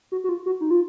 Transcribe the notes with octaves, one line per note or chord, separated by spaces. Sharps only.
F#4
F#4
F4
F#4
D#4
F4